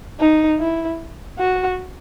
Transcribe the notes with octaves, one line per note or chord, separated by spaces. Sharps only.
D#4
E4
F#4